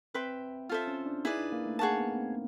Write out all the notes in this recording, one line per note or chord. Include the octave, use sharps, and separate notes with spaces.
C4 B4 E5 G5 C6
F4 A4 C5 E5
C#4
D4
D#4 E4 G#4 B4 D5
D4
A#3
A3
A#3 G#4 C#5 F#5 A5
B3
C4